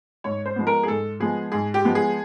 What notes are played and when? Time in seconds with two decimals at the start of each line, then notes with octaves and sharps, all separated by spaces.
0.24 G#2 C#5
0.46 C5
0.56 F3 G#3 B3
0.67 A#4
0.83 G#4
0.88 G#2 A4
1.20 F3 G#3 B3 G#4
1.52 G#2 G#4
1.74 G4
1.85 F3 G#3 B3
1.95 G#4